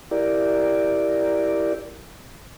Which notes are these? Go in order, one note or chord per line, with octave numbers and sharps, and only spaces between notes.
E4 G4 A#4 D5